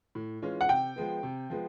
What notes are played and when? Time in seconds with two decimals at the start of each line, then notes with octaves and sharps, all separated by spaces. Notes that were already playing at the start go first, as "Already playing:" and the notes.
0.15 A2
0.42 E3 G#3 C#4 F4
0.61 F#5
0.69 C3 G5
0.96 F3 G#3 B3
1.23 C3
1.50 F3 G#3 B3